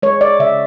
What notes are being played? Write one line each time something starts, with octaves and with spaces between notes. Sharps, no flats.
G#3 C#5
D5
C#3 E5